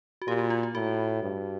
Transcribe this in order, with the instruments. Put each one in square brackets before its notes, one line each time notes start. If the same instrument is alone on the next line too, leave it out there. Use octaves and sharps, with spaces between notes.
[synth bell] F#4
[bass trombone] A#2 [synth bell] G4
[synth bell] F#4
F4
F4
[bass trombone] A2 [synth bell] F#4
[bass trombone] G2